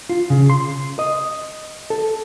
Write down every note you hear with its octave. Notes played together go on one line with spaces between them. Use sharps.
F4
C#3
C6
D#5
A4